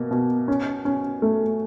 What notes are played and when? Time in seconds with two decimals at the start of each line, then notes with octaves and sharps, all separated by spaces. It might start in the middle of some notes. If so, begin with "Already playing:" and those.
Already playing: B2 A#3
0.11 B2
0.48 C#4
0.85 C#4
1.22 A3